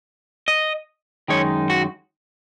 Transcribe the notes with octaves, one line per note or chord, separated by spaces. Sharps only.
D#5
F#2 D#3 G#3 D#4 C#5
F#4